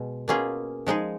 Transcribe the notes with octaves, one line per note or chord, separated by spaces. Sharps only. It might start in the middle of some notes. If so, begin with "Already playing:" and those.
Already playing: B2 G#3
B2 A#3 C#4 F4 G#4
F3 G#3 D#4 G#4